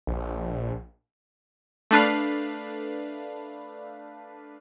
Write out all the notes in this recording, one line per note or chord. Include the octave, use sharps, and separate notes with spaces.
A#1
A3 D4 B4 F5